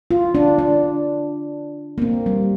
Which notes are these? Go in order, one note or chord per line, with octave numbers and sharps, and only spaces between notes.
F4
D4
D4
A#3
C4
G3